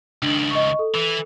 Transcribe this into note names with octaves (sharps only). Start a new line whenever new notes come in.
C#2 D#3 D4 F#7
D#5 C#6
A4
E3